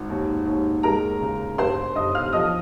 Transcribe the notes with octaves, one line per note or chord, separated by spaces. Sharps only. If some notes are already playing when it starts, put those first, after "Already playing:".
Already playing: G#1 G#2
D#2
D#2
G#3 A#4 A#5
C#3
G2 C5 C6
G2 D#5 D#6
F5 F6
F3 D#5 D#6